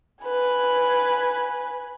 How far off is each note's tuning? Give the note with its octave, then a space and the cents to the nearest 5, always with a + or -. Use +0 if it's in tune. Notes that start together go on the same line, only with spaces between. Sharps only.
B4 +0 G#5 +0